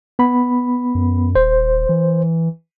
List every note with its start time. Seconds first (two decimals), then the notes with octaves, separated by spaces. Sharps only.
0.19 B3 B5
0.95 F#2
1.35 D#1 C5
1.89 E3